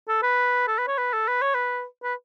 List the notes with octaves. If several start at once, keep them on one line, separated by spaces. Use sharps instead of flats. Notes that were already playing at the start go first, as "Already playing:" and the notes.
A4
B4
A4
B4
C#5
B4
A4
B4
C#5
B4
B4